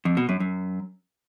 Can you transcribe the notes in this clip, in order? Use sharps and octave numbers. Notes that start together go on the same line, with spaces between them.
F2
B2
F#2
F#2